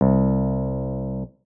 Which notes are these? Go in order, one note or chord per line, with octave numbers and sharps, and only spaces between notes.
C2